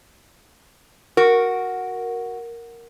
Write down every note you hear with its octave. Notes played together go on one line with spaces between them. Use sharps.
F#4 A#4